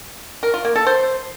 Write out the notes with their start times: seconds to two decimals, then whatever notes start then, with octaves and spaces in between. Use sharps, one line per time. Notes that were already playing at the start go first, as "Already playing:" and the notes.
0.43 A#4
0.54 F4
0.65 A#3
0.75 A4
0.86 C5